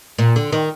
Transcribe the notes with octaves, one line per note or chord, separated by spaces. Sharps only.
A#2
D3
D#3